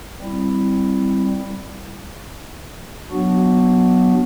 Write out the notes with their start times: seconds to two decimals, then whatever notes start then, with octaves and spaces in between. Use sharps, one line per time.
0.21 G3 C4 E4
3.11 F#3 B3 D4 F#4